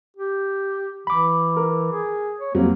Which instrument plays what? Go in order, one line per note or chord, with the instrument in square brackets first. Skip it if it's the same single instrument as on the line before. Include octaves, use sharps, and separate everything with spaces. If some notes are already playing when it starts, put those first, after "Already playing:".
[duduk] G4
[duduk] E3 [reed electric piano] B5 D6
[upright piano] A#4
[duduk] G#4
C#5
[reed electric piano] F2 [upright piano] F#3 G3 C4 [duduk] A#3